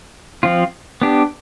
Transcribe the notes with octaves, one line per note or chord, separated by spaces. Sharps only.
F3 C4 F4
B3 D4 G4